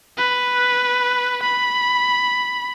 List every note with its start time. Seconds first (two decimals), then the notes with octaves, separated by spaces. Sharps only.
0.17 B4
1.43 B5